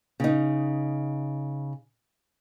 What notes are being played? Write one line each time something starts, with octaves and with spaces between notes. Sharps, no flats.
C#3 D#4